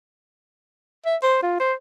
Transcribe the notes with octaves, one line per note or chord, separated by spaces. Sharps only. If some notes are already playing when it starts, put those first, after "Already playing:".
E5
C5
F4
C5